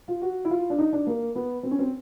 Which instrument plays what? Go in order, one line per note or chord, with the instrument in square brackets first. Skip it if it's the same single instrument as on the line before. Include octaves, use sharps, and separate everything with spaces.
[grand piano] F4
F#4
E4
F4
D4
D#4
D4
A#3
B3
C4
C#4
C4